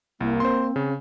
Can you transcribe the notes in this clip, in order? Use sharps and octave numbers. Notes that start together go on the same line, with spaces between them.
C2 A#3 E4
C4 C5 C6
C#3